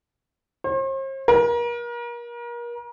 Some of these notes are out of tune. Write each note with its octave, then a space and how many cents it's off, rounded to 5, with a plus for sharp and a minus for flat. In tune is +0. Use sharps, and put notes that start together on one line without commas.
C5 +45
A#4 +35